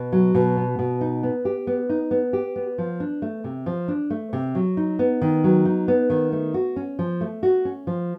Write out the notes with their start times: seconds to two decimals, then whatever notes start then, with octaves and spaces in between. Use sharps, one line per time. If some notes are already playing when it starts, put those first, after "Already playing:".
Already playing: B2
0.12 F#3
0.35 B2
0.57 B3
0.79 B2
1.01 D#4
1.23 B3
1.45 G4
1.67 B3
1.89 D#4
2.11 B3
2.33 G4
2.56 B3
2.78 F3
3.00 D4
3.22 A3
3.44 C3
3.66 F3
3.88 D4
4.10 A3
4.33 C3
4.55 F#3
4.77 D#4
4.99 B3
5.22 D#3
5.44 F#3
5.65 D#4
5.88 B3
6.10 D#3
6.32 A3
6.54 F#4
6.76 C#4
6.99 F3
7.21 A3
7.43 F#4
7.65 C#4
7.87 F3